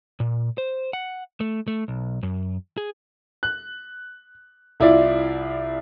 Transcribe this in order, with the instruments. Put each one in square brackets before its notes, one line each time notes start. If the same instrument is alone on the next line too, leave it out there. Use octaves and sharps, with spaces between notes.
[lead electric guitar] A#2
C5
F#5
A3
A3
B1
F#2
G#4
[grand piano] F#6
C2 E4 F4 D5